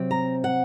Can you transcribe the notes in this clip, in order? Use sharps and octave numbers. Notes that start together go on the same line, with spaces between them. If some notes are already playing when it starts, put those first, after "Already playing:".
Already playing: C3 F#3 C4
A#5
F#5